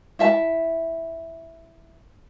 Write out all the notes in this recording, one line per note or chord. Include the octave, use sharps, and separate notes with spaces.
E4 E5 A5